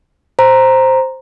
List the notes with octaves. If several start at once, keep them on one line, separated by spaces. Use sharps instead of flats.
C5 A#5